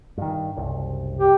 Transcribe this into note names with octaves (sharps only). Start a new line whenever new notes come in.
G2 D#3
F#1 C2
G4